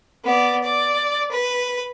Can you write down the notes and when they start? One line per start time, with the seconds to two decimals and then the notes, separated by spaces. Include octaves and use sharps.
0.24 B3 D5
0.63 D5
1.31 B4